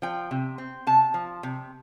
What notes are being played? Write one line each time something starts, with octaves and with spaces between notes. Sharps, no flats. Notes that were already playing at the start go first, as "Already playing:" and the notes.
F3 G5
C3
C4
C3 A5
F3
C3